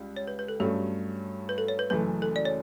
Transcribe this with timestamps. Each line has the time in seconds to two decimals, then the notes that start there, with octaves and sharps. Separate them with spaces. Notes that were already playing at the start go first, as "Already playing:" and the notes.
Already playing: C#2 G3
0.17 C#5
0.28 B4
0.39 B4
0.48 A4
0.60 G2 F#3 A3 C#4 G4
1.49 B4
1.58 A4
1.68 C#5
1.79 B4
1.90 F#1 F#2 E3 A3 B4
2.22 A4
2.36 D5
2.45 C#5